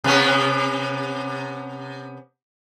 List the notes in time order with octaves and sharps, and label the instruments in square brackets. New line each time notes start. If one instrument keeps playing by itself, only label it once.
[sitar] C3 B3 C#4